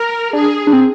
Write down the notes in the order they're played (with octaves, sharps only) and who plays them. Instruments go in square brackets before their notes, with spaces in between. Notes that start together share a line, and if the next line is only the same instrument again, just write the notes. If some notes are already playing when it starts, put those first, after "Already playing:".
Already playing: [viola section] A#4
[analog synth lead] D4 [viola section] G#4
[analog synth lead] D4
C4